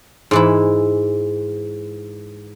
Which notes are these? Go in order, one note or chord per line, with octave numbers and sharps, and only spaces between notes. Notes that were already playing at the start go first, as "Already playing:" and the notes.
G#2 E3 E4